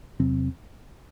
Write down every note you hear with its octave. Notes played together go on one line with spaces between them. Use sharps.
E2 C3 F#3 C4